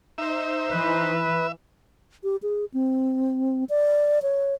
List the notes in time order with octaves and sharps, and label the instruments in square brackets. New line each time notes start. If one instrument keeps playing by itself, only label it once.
[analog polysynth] D#4 C5 [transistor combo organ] E5
[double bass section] E3 [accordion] B4
[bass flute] G4
G#4
C4
D5
C#5